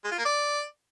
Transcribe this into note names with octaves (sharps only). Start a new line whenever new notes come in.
G#3
F4
A#3
D5